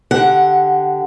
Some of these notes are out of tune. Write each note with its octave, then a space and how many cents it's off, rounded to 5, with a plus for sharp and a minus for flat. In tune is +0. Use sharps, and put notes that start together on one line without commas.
D3 +0 G4 +0 F#5 +0